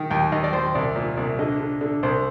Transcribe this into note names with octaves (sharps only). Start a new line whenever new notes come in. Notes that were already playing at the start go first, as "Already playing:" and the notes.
Already playing: D#3
D#2 G5
D#2 D#5
D5
D#2 C5
C2 D5
A#2
C2
D3 D#5
D3
D3
C2 C5